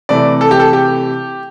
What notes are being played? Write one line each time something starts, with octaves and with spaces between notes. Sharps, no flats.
C3 E3 A3 D5
A4
G4
A4
G4